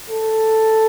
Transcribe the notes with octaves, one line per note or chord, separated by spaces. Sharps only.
A4